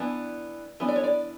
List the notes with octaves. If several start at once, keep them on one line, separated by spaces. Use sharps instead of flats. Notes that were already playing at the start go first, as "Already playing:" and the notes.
Already playing: E3 B3 D4 D5
E3 B3 D4
D5
C#5
D5